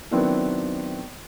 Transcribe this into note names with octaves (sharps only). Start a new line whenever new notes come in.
D#3 F#3 B3 C4 D4 E4